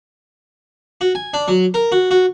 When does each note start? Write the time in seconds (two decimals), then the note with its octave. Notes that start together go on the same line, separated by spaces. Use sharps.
1.01 F#4
1.15 G#5
1.34 D4
1.48 F#3
1.74 A#4
1.92 F#4
2.11 F#4